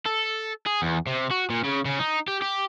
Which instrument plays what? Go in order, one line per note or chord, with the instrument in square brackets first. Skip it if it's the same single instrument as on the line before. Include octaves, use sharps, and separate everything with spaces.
[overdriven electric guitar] A4
G#4
E2
C3
F#4
A#2
C#3
C#3
D#4
G4
G4